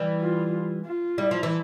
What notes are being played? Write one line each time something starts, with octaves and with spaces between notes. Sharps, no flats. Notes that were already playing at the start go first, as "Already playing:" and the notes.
Already playing: E3 G3
F4
F4
G3 E4
F3
E3